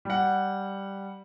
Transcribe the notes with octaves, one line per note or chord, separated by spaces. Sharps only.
G3 F#5